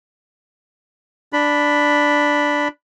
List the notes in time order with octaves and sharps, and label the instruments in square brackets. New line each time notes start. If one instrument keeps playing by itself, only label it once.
[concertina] D4 B5